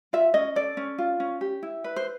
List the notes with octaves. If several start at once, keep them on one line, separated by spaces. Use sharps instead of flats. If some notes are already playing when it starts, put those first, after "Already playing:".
F4 E5
C#4 D#5
A4 D5
C#4
F4
C#4
G4
E4
B4
C5